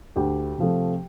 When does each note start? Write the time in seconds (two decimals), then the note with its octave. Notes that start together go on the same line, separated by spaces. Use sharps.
0.16 D2 G4 G5
0.58 C3 F3 A3